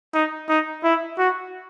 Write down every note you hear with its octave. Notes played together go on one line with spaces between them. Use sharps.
D#4
D#4
E4
F#4